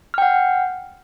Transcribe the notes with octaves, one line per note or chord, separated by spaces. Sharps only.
F#5 G5 F6